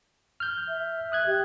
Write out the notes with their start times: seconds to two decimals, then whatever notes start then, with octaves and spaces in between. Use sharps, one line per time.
0.40 F6 G6
0.68 E5
1.12 D#6 F#6 G#6
1.26 G4